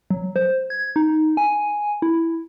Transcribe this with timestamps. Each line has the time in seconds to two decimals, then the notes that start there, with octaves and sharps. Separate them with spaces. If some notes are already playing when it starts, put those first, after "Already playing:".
0.10 F#3
0.36 C5
0.70 G#6
0.96 D#4
1.37 G#5
2.02 E4